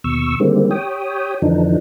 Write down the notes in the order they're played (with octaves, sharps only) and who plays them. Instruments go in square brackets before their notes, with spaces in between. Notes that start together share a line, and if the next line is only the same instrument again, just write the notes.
[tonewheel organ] D#2 B2 C#6 E6
D3 D#3 G3 G#3 A#3 C4
G4 C#5 G5 D#6
F2 D3 E3 F3 D4 D#4